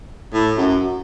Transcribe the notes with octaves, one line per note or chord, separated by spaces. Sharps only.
A2
F#2